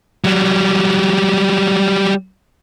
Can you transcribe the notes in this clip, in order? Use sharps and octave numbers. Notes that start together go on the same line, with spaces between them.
F#3 G3